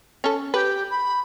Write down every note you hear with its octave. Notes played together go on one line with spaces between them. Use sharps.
C#4 A4
G4 B4
B5